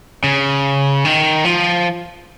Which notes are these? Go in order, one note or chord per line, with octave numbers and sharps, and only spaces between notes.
C#3
D#3
F3